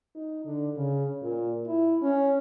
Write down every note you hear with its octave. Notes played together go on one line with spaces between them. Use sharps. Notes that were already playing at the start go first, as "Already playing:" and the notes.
D#4
D3
C#3
A#2
E4
C#4